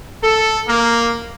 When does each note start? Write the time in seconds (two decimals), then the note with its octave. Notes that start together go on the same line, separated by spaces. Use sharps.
0.22 A4
0.67 A#3